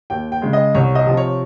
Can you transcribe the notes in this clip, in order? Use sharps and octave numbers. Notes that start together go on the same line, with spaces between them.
D#2 G5
G5
C#3 G#3
D#5
C2 C#5
D#5
C3 F3
C#5